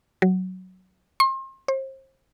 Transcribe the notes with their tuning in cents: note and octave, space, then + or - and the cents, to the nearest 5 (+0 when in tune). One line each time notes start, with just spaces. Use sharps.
F#3 +5
C6 +35
C5 +35